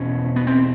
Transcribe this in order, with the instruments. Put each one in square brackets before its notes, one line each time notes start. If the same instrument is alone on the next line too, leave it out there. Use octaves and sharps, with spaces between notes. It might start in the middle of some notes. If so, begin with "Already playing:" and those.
Already playing: [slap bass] E2 B2 C#4
B3
C4